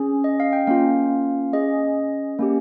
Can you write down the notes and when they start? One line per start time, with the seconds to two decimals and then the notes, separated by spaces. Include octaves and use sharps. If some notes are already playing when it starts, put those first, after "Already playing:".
Already playing: C#4 G#4
0.24 D#5
0.40 F5
0.53 G5
0.67 A#3 C#4 F4 F5
1.53 C#4 G#4 D#5
2.39 A#3 C#4 G4